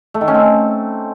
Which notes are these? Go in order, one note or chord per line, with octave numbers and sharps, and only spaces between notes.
A3
D#3
C#4
C4